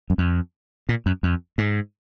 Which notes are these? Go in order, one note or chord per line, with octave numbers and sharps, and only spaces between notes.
F#2
F2
A#2
F#2
F2
G#2